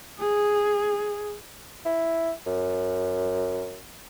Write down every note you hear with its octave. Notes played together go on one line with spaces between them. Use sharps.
G#4
E4
F#2